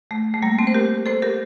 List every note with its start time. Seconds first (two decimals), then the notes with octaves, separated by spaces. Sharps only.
0.11 A3
0.34 A3
0.42 G3 A#3
0.59 A3 C4
0.67 C5
0.74 G4 A#4
1.06 A4 C5
1.22 G4 A#4